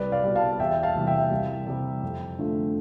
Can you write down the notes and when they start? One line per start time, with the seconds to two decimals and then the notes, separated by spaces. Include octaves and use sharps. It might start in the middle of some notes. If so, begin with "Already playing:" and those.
Already playing: C2 B4 D5
0.12 D5 F5
0.24 B2 G3
0.36 F5 A5
0.60 E2 E5 G5
0.83 F5 A5
0.95 C3 E3 G3
1.07 E5 G5
1.31 C2
1.67 C3 G3
2.03 F2
2.39 D3 F3 A3